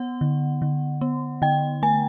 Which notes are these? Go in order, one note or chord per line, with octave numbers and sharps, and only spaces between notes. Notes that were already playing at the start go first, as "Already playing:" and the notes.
Already playing: B3 F#5
D3
D3
B3
D3 G5
A3 G#5